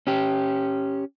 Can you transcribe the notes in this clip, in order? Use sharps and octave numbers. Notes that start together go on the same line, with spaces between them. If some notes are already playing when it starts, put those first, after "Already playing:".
C#4 G4